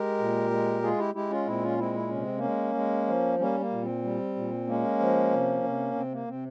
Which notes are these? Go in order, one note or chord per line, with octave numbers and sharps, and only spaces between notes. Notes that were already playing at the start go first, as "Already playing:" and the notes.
Already playing: G#3 G4 A#4
A#2
G#3
G#3 F4 G#4
E4 G4
G#3 E4 G4
C#4 F4
A#2 C4 E4
C#4 F4
G#3 C4 E4
E4
C3 C#4
C4
A#3 C#4
G#3
G#3
F3
G3 A#3 C#4
A#3
A#2
C4
G3
A#2
G#3 A#3 C#4
F3
C3
C3
C3 C4
A#3
C3 C4